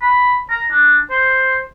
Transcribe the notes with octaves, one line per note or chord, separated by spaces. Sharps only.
B5
A#5
D4
C5